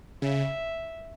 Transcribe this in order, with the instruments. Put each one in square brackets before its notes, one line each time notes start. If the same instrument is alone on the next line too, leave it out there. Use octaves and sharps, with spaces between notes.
[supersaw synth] C#3 [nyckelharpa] E5